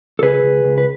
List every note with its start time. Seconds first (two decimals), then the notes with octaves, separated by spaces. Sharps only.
0.19 A4
0.23 C#2 G#4 B4
0.43 C#2
0.64 C#2
0.78 B4